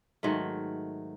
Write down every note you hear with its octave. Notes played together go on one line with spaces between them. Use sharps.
G#2 D#3 F#3 A3